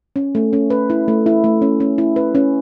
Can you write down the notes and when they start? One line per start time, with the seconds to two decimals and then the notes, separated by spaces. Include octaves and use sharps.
0.16 C#4
0.35 A3
0.53 C#4
0.70 B4
0.90 E4
1.08 A3
1.26 E4
1.44 A3
1.62 C#4
1.80 C#4
1.98 E4
2.16 B4
2.35 C#4